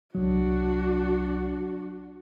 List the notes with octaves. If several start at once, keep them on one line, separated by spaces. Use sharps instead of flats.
C2 F#3 D4 F#4